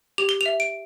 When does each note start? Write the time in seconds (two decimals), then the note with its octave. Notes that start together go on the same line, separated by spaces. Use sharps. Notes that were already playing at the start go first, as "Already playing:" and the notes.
0.18 G4 F7
0.29 G7
0.41 F7
0.46 E5
0.60 D7